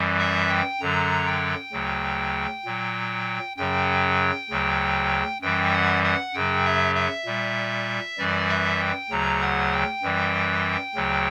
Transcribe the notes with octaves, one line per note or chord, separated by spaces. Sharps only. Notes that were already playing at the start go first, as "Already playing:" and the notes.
Already playing: F#2 E3 G3
E5
G5
F#2 D3 F#3 A#5
G5
D2 C#3 F#3
A#2 F#3
F#2 C#3 F#3 G5
D2 C#3 F#3
F#2 E3 G3 G5
F#5
F#5
F#2 C#3 F#3 G5
E5
E5
A#2 G3
F#2 E3 G3 D5
E5
G5
D2 C#3 F#3 A#5
F#5
G5
F#2 E3 G3
D2 C#3 F#3